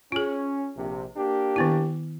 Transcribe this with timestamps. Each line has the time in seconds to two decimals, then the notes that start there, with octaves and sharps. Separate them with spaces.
0.12 C#4 F4 G#4
0.76 A#1 C3
1.17 A#3 D4 G4
1.56 D#3 B3 E4